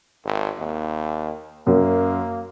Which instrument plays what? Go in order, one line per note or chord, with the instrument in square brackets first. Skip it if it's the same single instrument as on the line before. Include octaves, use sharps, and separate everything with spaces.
[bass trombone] G#1
D#2
[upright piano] F#2 [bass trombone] A#3